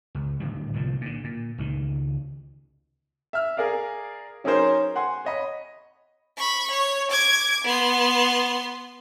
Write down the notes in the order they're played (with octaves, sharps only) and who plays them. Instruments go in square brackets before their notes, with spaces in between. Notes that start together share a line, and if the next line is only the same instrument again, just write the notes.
[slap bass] C#2
A2 D3 D#3 G3
C2 A#2 F3
A#2 D3
A#2
C#2 D#3
[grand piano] E5 F6
G#4 A#4 D5 F5
F#3 C#4 D#4 G#4 A#4 C5
F#5 G#5 C6
C#5 D#5 B5
[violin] B5 C#6
C#5
D6 G#6
B3 C6